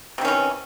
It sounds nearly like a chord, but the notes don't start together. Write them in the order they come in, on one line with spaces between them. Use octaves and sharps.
C3 D#3 C#4 E3